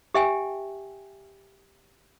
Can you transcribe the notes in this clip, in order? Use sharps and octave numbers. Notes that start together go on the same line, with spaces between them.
G4 E5 G5 G#5